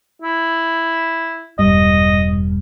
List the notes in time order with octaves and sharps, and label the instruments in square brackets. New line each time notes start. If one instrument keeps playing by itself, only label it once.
[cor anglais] E4
[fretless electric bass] E1 G2 [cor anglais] D#5